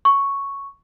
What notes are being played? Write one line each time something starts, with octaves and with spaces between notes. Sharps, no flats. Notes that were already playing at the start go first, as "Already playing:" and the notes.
C#6